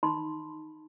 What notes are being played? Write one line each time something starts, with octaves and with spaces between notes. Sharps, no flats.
D#4 B5 C6